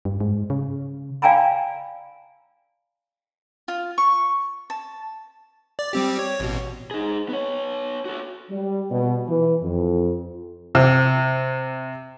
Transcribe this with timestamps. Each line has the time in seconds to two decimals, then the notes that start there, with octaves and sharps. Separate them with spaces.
0.05 G2
0.20 G#2
0.50 C#3
1.22 D5 F5 G5 G#5 A#5 B5
3.68 F4
3.98 C#6
4.70 A5
5.79 D5
5.93 G3 C4 G4
6.19 C#5
6.40 A1 B2
6.91 D#4 G#4
7.29 B3 C#5
8.05 F#4 A4
8.50 G3
8.91 B2
9.28 E3
9.63 F2
10.75 C3